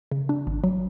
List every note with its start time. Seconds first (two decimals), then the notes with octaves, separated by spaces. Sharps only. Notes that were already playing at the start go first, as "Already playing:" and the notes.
0.11 C#3
0.29 D4
0.47 G#1
0.64 F#3